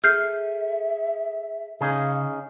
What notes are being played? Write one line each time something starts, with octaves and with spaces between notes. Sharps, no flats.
G#4 A4 E5 F6 G6 C7
C#3 C#4 D#4 G#4 F5